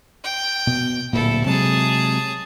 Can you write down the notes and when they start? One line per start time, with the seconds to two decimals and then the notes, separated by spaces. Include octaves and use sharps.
0.24 G5
0.67 B2
1.13 D1 A#2 E4 A4
1.46 C3 F#3 G#3 G#4 A5